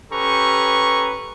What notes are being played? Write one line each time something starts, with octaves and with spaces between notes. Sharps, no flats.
C#4 G4 A4 B4 A#5 C#6